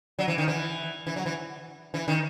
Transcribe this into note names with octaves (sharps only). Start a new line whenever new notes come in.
F#3
E3
D#3
E3
E3
F#3
E3
E3
D#3